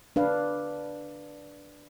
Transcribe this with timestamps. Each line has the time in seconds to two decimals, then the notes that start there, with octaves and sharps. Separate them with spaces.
0.16 D4 B4 F5